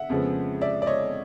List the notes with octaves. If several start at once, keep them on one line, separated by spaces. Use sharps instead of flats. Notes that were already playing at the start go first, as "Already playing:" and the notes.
Already playing: E5 F#5
F2 C#3 F3 G#3 B3
D5 E5
D5
C#5 D#5